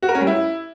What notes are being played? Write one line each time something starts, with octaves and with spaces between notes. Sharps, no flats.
F#4
A#4
C#4
G3
E4